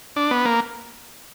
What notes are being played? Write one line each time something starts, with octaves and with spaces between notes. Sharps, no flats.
D4
B3
A#3